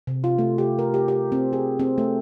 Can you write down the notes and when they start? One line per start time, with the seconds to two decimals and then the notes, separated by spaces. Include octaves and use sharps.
0.07 C3
0.24 F4
0.38 A3
0.58 G4
0.79 A#4
0.94 G4
1.08 G4
1.32 C4
1.53 G#4
1.79 C4
1.98 A3